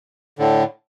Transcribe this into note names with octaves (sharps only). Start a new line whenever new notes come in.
A2 D3